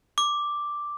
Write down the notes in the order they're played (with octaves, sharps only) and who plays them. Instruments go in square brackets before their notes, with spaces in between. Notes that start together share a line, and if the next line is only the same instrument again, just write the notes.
[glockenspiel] D6